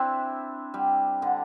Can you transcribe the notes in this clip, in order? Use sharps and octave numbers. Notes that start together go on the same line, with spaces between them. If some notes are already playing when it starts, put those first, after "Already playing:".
Already playing: C4 D4 E4
G3
D3